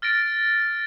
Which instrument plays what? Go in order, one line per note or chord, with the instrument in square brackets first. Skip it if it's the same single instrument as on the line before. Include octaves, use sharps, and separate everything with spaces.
[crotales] F6 A6 A#6 D7